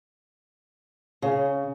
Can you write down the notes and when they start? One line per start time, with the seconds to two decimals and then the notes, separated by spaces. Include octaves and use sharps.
1.22 C#3